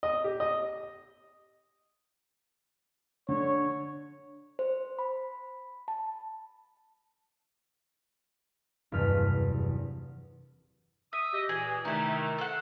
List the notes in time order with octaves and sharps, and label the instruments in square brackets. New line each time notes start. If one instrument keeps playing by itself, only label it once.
[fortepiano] D#5
G4
D#5
[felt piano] D3 [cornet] C#5
[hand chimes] C5
B5
A5
[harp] F#1 E2 G2 C3 F6 B6
[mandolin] E5 [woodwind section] D#6
[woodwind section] G4 D#5
[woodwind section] A#2 E3 [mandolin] G#4
[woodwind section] C3 D#3 A3 [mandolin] D#4 E4
[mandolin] A4 C5 F#5